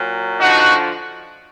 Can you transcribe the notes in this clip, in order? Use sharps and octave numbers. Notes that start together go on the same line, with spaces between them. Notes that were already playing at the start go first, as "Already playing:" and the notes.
Already playing: A#2 F#3
D3 F3 D#4 F#4